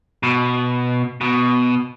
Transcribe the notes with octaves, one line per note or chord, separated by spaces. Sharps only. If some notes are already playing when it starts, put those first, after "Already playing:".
B2
B2